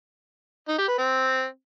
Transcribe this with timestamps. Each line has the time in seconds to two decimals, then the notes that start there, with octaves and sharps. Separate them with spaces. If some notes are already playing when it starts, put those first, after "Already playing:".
0.69 D#4
0.78 G4
0.88 B4
0.98 C4